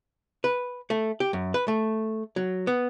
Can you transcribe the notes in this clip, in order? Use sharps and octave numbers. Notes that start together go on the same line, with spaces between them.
B4
A3
G4
F#2
B4
A3
F#3
B3